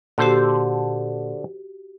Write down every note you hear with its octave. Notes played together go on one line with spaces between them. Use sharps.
A#2 D3 F#4 G4 A4 C5